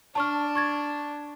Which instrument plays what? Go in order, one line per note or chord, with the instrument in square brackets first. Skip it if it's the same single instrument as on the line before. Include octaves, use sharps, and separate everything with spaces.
[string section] D4 [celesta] A5 C#6 F6
[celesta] C#6 G#6 A6